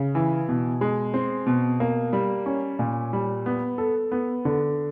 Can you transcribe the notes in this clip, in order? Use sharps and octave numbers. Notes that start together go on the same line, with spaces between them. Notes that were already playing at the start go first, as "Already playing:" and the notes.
Already playing: C#3
E3
B2
G#3
C4
B2
A#3
G3
C#4
A#2
G3
B3
A4
B3
D3